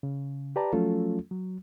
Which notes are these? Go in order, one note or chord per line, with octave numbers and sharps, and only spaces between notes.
C#3
G4 B4 D5 A5 A#5
F3 F#3 A3 C#4 F4 A4
F#3